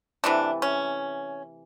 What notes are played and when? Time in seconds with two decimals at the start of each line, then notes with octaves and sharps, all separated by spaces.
0.24 C3 E3 A3 D4
0.62 C#4